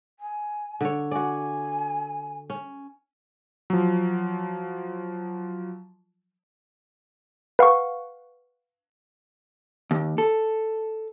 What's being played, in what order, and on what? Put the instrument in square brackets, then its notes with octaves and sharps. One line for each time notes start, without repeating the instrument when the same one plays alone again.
[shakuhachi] G#5
[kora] D3 C#5
[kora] F#4 D5 [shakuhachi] G#5
[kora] C#4
[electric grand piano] F3 F#3
[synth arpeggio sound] B4 F5 F#5 C#6
[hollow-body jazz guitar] D#2
A4